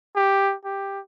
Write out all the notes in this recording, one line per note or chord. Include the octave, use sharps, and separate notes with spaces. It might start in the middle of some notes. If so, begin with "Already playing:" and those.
G4
G4